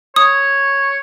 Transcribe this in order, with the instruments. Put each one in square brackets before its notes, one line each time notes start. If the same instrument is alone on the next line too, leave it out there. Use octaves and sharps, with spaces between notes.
[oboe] C#5 [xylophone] D#6